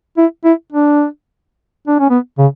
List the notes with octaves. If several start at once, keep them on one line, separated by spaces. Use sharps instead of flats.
E4
E4
D4
D4
C#4
B3
C#3